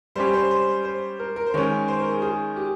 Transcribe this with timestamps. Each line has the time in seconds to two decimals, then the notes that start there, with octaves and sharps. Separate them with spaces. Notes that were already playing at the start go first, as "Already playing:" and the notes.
0.15 G3 C#4 G4 C5
0.33 C5
0.51 C5
0.84 C5
1.19 A#4
1.36 A#4
1.47 C5
1.54 D#3 G#3 C#4 C#5
1.88 C5
1.99 A#4
2.11 G#4
2.22 G#4
2.56 G4